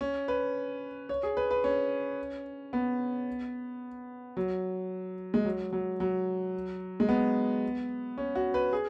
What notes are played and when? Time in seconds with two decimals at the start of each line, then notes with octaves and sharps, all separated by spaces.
0.01 C#4
0.28 B4
1.09 C#5
1.23 G#4
1.37 B4
1.51 B4
1.64 C#4
2.73 B3
4.37 F#3
5.34 G#3
5.45 F#3
5.73 F#3
6.00 F#3
7.00 G#3
7.09 B3
8.18 C#4
8.35 F#4
8.54 B4
8.73 G#4